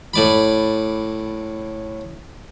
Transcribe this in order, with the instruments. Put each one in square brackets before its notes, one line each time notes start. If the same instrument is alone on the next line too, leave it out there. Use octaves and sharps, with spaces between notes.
[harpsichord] A2 D5 B5